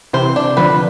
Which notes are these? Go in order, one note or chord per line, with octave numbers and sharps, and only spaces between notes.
C3 E3 C5
D4
D3 F3 B4